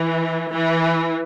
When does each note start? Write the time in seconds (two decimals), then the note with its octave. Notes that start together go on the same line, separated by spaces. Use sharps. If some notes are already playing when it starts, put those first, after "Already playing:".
Already playing: E3
0.52 E3